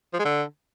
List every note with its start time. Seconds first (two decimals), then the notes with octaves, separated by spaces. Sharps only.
0.14 F3
0.19 G#3
0.25 D3